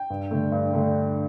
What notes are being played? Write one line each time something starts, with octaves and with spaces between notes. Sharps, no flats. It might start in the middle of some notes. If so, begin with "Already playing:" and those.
Already playing: G5
G2
D3 A3
G2
D3 A3